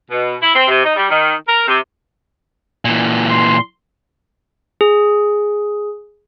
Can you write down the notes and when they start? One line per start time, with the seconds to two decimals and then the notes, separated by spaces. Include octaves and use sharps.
0.09 B2
0.42 E4
0.54 C4
0.67 C3
0.83 D#4
0.95 G3
1.09 D#3
1.46 A#4
1.68 C3
2.85 A#2 E3
3.29 C6
4.81 G#4